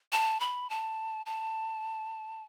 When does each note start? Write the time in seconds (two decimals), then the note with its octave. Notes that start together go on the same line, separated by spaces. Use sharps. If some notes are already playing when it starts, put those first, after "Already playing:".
0.12 A5
0.40 B5
0.70 A5
1.26 A5